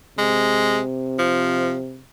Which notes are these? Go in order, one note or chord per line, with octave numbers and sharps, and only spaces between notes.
C3 G#3
F3